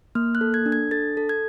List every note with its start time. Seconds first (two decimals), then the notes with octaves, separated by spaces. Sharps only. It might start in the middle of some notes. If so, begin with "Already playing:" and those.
0.15 A#3 F6
0.35 F#6
0.41 A4
0.54 G#6
0.66 D4
0.72 G#6
0.91 A4 A6
1.17 A4
1.29 G#6